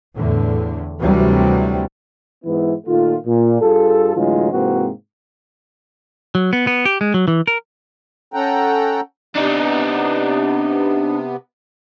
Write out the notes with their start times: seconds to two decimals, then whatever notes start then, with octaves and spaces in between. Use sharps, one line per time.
0.16 E2 A2 D3
1.01 D2 C3 E3 F#3 G3
2.45 G#2 E3 B3 E4
2.87 A#2 D#3 A3 F4
3.27 A#2
3.61 G2 F4 G#4 A4
4.16 A2 D3 E3 F#3 G#3 F4
4.52 G#2 C3 E3 A#3 C4 F#4
6.35 F#3
6.53 B3
6.67 B3
6.85 G4
7.01 G#3
7.14 F#3
7.28 E3
7.47 A#4
8.34 C#4 A4 F#5 G5 A#5
9.36 C3 B3 D4 D#4